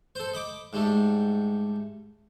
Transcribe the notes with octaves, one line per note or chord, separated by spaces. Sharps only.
A4 C5
D#5 B5 D6
G#2 G3 A3